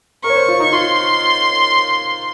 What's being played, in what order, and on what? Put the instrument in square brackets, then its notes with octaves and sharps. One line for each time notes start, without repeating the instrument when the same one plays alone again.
[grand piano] A#4 [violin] C#6
[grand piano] C#5
C5
F4
D#4
[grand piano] F4 [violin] C6